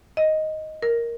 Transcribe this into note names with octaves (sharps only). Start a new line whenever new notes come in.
D#5
A#4